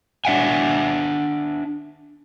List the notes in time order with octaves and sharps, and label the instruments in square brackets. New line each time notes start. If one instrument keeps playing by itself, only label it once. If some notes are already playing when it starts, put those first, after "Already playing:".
[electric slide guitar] D4 E5 F#5 G#5